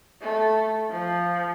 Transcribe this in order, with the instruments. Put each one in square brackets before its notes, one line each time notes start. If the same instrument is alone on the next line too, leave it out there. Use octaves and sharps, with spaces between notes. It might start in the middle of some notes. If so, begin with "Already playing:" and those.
[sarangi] A3
F3